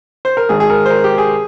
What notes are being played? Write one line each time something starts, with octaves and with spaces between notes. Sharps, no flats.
C5
A#4
G#1 G#2 D#3 G#4
G#4
A#4
C5
A#4
G4
G#4